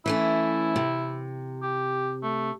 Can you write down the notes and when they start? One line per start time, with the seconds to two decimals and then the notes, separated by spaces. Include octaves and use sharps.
0.06 E3 A3 C#4 E4
0.76 C3
1.63 G4
2.23 A3